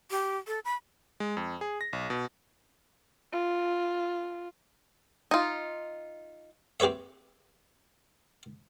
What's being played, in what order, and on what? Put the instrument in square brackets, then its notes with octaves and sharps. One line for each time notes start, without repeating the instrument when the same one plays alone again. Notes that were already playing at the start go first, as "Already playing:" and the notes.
[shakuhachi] G4
A4
B5
[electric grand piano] G#3
F2
G#4
A#6
B1
B2
[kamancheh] F4
[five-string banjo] D#4 F4
[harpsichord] C4 G4 B4 C#5 E5